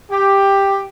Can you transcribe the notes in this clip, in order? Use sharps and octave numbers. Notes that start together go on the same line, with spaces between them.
G4